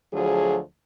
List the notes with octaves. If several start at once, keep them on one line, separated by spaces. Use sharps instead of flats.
D2 F3 F#3 G#4